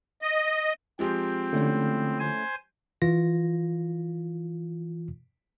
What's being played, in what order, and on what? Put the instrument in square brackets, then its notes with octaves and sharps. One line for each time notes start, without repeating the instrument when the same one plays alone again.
[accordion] D#5
[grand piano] F3 G#3 G4 [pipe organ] C4
[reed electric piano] D3 [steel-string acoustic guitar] A3 C#4 E4
[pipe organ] C5 G#5
[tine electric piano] E3 F4 A#6